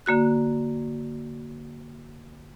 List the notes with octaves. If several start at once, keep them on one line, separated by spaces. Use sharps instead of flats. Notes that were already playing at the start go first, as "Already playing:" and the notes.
D3 A#3 F#4 F#6